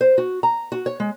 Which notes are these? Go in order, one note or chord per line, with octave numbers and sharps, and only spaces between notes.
C5
F#4
A#5
F#4
C#5
G#3